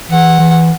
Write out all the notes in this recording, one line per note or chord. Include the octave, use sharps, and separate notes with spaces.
E3 F#5
E3